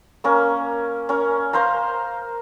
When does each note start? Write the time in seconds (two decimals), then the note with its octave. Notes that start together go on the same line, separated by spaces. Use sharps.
0.24 A#3 C#4 A#4
1.09 C#4 A#4
1.53 A#4 C5 F5 A#5